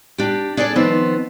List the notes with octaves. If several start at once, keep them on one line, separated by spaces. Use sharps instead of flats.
D4 G4
D4 G#4 A4 C5 D5
D#3 F3 B3 C4